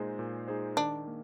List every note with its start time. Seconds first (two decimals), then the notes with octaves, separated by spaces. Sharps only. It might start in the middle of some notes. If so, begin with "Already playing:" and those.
Already playing: A#2 G#3 D#4 G#4 C5
0.19 A#2
0.48 G#3 D#4 G#4 C5
0.77 D#3 D4
1.07 A#3